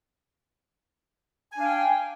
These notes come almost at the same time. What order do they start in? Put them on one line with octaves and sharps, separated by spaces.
G#5 D4 F5 G5